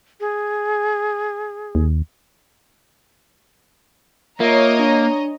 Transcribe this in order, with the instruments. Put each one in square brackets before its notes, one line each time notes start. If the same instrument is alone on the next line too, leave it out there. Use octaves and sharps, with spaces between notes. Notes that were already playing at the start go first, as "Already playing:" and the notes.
[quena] G#4
[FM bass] D#2
[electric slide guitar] A#3 [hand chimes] F4 A#4 E5 [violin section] C#5 D#5 A#5
[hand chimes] D4